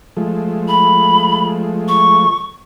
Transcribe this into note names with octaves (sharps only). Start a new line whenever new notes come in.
F3 G#3 A3
B5
C#6